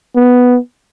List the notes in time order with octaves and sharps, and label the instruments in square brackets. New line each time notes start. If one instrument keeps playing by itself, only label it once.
[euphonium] B3